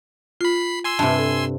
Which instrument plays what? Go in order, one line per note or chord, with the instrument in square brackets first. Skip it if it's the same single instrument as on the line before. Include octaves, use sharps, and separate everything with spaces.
[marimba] F4 [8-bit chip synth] B5 C7
[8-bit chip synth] G#5 C6 E6
[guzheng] G2 C3 [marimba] A5
[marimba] A4